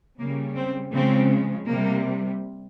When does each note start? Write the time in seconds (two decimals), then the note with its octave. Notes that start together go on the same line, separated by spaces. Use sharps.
0.18 C#3 G3 A#3
0.56 C4
0.93 C#3 F3 G#3 C4
1.68 C3 G3 A#3